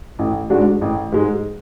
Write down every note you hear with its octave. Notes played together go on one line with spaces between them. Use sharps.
A1
G#2 G#3 D4 F#4
A1
G#2 G#3